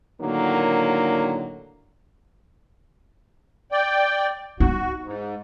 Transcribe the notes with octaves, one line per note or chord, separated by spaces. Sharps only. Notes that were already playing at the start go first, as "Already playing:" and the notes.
A2 D3 D#3 F#3 A#3
D5 G5
D#4 F#4
G#2